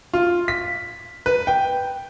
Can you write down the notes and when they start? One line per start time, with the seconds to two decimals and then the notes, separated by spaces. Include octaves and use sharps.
0.14 F4
0.48 B6
1.26 B4
1.47 G5